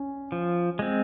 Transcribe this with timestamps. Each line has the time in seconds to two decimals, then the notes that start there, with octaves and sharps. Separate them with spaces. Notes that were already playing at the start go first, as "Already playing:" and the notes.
Already playing: C#4
0.32 F3
0.79 G#3 C4